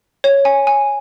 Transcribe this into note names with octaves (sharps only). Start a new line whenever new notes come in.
C#5
G#5
G#5